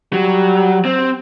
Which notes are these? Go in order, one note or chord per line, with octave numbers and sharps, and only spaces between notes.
F#3 G3
C4